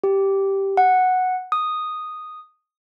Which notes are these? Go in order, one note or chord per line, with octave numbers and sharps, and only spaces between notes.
G4
F#5
D#6